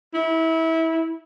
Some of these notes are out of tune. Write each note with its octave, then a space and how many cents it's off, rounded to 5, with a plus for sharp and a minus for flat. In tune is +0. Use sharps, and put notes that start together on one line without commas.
E4 -25